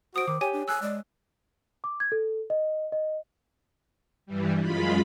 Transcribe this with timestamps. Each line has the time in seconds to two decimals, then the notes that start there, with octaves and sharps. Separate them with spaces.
0.16 F#4 C5 D#6 D7
0.28 D#3 D6
0.41 G4 C#5 G5 G#5 D#7
0.53 D4
0.68 G#5 E6 F#6
0.82 G#3 D5
1.84 D6
2.00 G#6
2.12 A4
2.50 D#5
2.92 D#5
4.26 G2 E3 G3
4.61 F#2 G#3 F4 B5